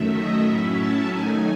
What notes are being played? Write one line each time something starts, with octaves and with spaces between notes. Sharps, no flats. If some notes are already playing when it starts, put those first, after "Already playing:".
Already playing: F#2 D#3 F#3 A3 E5
D#5
A2 F#3 C#4 E4 E5
A5
D#3 F#3 A3 D#4 G#5